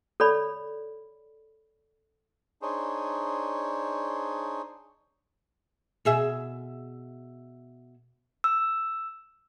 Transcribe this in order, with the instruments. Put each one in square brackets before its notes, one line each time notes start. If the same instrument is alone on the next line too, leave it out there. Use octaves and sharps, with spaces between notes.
[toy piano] A4 C#5 D5 B5
[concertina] D4 D#4 G#4 C5 C#5
[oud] B2 G#4 E5
[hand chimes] E6